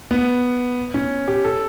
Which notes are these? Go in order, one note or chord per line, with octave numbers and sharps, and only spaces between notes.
B3
C#4
G4
A4